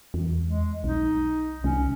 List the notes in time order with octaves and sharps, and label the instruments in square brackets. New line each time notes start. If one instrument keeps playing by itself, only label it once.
[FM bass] E2
[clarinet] G#3
[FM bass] B1 [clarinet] D#4
[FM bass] C2 [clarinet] C#4